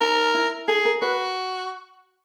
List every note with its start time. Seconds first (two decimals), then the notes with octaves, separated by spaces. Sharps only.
0.01 D#4 A#4
0.34 E4
0.68 G#4 A4
0.85 A#4
1.02 F#4 B4